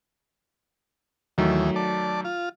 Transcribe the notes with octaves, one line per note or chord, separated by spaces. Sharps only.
D#2 D#3 E3 F#3 A3
D5 A5
F4